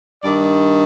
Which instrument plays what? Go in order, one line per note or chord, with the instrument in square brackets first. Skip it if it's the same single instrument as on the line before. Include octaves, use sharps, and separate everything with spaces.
[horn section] G2 D#3 D5